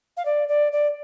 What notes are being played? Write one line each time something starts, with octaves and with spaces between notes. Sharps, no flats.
F5
D5
D5
D5